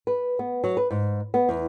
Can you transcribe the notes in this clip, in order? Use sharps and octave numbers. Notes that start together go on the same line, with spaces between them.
B4
B3
F#3
B4
G#2
B3
E2